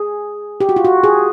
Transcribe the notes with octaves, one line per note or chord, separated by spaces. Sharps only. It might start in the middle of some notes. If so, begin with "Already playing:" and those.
Already playing: G#4
G4
F#4
F4
F#4
G#4